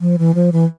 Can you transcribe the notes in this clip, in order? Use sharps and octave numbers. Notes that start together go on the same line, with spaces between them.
F3
E3
F3
E3